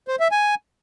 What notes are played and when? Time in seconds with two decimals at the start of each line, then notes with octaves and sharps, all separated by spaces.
0.08 C5
0.20 E5
0.31 G#5